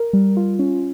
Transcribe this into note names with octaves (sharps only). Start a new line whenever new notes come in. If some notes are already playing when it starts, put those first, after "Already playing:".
Already playing: A#4
G3
F4
C#4